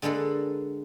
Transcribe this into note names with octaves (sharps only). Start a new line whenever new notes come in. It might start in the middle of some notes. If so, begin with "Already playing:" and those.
D3 G#3 A#3 A4 B4